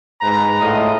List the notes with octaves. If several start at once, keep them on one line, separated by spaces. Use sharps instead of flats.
G#2 B4 A#5
A2 F4 D#5